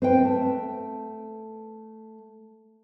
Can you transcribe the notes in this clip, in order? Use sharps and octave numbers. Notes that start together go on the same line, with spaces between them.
C4 B4 G5
A3